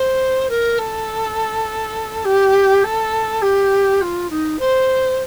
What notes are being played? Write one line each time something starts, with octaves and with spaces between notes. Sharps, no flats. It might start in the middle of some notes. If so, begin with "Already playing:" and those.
Already playing: C5
A#4
A4
G4
A4
G4
F4
D#4
C5